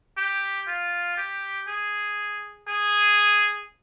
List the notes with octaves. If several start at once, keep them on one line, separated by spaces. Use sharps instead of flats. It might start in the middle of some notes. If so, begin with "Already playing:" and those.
G4
F4
G4
G#4
G#4